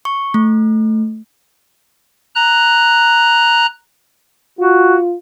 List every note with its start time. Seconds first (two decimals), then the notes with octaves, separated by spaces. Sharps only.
0.05 C#6
0.34 A3
2.35 A#5 F#6
4.59 F4 F#4